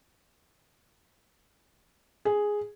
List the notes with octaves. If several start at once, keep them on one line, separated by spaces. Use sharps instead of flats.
G#4